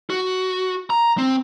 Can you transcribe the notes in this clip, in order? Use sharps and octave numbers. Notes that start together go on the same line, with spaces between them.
F#4
A#5
C4